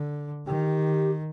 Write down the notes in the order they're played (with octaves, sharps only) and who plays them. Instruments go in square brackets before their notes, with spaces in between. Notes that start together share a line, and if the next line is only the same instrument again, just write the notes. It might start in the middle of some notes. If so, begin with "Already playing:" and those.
Already playing: [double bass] D3
[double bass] D#3 [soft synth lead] G4